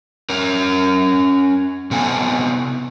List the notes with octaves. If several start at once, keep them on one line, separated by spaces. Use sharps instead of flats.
C#4 A#4
C3 B3 A4 G#5